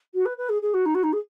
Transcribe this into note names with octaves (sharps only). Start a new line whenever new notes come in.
F#4
B4
B4
G#4
G#4
F#4
D#4
F#4
D#4
G#4